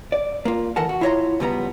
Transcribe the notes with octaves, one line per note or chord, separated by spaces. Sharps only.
D5
A#3 F4
D2 E3 A4 A#4 F#5 A5
F#4
E4 F4 C#5 D#5 A#5 C6
C#2 B2 F3 G3 B3 A#5